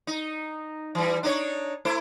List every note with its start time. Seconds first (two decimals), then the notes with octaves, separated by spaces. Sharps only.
0.07 D#4
0.95 E3 G3
1.23 D4 D#4 C#5
1.85 A3 E4 C5